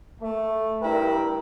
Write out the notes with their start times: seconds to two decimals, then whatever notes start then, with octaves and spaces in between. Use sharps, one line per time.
0.21 A3
0.82 G2 E4 A#4 G5